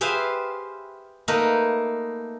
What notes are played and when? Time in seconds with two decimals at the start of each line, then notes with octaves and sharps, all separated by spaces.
0.01 G4 G#4 B4 C5 E5 F5
1.28 A3 A#3 D#4 A#4 B4